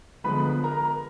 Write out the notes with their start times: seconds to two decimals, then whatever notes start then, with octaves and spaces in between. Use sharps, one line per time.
0.24 D3 F3 G#3 B3 B4 B5
0.64 A#4 A#5